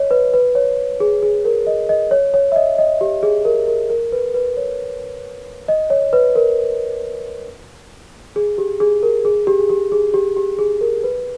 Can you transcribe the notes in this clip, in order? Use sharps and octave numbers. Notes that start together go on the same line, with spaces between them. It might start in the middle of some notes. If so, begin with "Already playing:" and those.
Already playing: C#5 D#5
B4
B4
C#5
G#4
G#4
A#4
D#5
D#5
C#5
C#5
E5
D#5
D#5
G4
G#4
A#4
A#4
A#4
B4
B4
C#5
D#5
C#5
B4
A#4
G#4
G4
G#4
A#4
G#4
G4
G#4
G4
G#4
G4
G4
G#4
A#4
B4